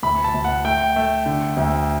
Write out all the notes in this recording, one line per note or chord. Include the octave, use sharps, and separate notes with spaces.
D2 B5
A5
D2
F#5
A3 G5
A3
D3
D2